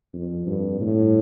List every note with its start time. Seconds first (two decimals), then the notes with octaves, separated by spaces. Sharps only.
0.14 F2
0.47 G2
0.80 A2